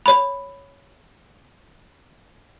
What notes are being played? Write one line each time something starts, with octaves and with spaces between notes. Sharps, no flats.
C#5 B5